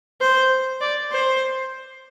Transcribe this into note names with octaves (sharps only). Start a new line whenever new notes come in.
C5
D5
C5